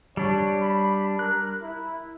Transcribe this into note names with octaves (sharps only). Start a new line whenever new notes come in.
G3 D4 C#5
B5
A#4 F#6
E4